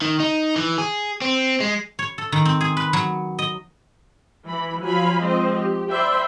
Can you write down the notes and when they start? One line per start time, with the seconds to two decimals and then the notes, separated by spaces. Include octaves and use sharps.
0.02 D#3
0.20 D#4
0.56 E3
0.78 G#4
1.22 C4
1.60 G#3
1.99 C#5
2.18 A4
2.32 D#3
2.45 C4
2.61 G#4
2.77 B4
2.93 F#3
3.39 D#5
4.49 E3 B5
4.82 F3 F#3 F5 G#5 B5
5.21 F3 G#3 C4 C5 D#5
5.55 G4
5.91 C5 D5 E5 G5 B5 C6